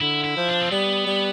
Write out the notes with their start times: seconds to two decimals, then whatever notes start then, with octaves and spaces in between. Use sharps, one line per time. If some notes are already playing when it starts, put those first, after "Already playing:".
0.01 D3 E4
0.24 E4
0.37 F3
0.48 D4
0.62 C4
0.71 G3 B3
1.07 G3